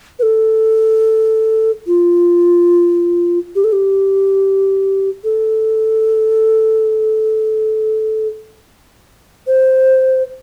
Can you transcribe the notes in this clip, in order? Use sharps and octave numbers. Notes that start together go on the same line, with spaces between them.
B4
A4
F4
G4
A4
G4
A4
C5